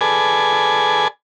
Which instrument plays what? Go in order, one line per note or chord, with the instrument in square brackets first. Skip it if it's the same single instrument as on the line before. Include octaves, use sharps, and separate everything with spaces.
[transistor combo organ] G#4 A4 B4 D5 G#5